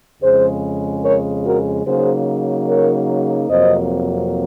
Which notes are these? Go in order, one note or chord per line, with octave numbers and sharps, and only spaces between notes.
F2 C#3 G#3 G#4 C5
A#4 C#5
F#4 A#4
C#3 F#3 A#3 D#4 G#4 C5
A#4 C#5
F2 C3 F#3 A#3 C5 D#5